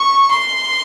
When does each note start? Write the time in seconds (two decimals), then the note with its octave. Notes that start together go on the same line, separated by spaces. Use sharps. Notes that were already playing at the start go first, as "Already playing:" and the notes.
Already playing: C#6
0.31 C6